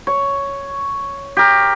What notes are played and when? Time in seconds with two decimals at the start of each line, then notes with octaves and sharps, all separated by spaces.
0.07 C#5
1.37 G4 A#4